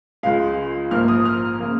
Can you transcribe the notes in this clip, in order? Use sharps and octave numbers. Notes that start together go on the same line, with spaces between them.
C#2 C#3 G#3 F5
A#1 G#2 F3 A#3 F6
D#6
F6
C#3 A#3